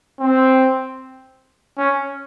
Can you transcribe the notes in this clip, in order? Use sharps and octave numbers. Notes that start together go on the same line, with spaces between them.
C4
C#4